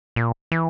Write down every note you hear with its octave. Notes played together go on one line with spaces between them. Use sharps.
A#2
E3